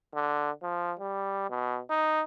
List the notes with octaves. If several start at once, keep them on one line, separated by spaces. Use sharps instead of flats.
D3
F3
G3
B2
D#4